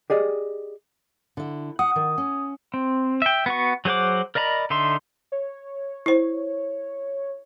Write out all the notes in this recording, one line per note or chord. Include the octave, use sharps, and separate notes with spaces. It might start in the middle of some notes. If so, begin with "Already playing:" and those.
G4 G#4 D5 D#5
D3 E4
F#5 D#6
D#3
C#4
C4
E5 G5
B3 F#4 C#6
F#3 G#4 C5 F#5 D6
A#4 D5 D#5 A#5 B5
D3 D#4 A4 E5 C6
C#5
E4 C5